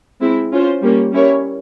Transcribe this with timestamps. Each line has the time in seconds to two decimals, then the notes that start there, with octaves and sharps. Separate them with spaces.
0.21 G#3 C4 E4
0.52 C#4 F4 C5
0.82 G3 A#3 C#4
1.12 G3 C#4 E4 A#4 C#5